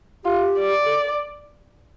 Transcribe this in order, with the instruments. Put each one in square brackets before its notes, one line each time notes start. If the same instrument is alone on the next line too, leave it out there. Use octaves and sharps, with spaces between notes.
[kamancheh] F4 [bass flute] G4
[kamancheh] D5
[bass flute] A4